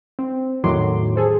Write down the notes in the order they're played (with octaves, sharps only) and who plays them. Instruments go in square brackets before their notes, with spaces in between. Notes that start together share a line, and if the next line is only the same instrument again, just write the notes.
[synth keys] C4
E2 A2 D#3 F#3 C6 D6
G#4 A4 C5